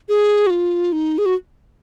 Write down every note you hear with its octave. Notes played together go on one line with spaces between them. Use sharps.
G#4
F#4
F4
D#4
G#4
F#4